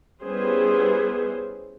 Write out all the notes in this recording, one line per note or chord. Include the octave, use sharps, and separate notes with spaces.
G3 B3 C#4 E4 G#4 C5